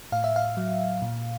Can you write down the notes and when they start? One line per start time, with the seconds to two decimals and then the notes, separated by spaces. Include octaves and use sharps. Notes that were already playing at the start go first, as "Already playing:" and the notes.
0.12 A2 F5
0.24 E5
0.36 F5
0.57 F#3
1.02 A#2